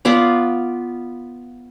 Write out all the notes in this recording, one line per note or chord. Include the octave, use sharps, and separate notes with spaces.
B3 F4 D5